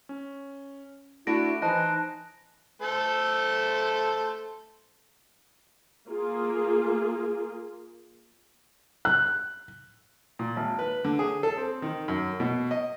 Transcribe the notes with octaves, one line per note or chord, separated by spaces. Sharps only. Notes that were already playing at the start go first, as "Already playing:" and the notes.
C#4
A3 D4 E4 F#4 A#6 D7
E3 D#4 C5 D#5 A5 F#6 A#6
A3 A4 C5
A#3 F4 G#4
F#6
A#2
G#1
B4
D3
G#4
A4
C4
D#3
F#2
B2
D#5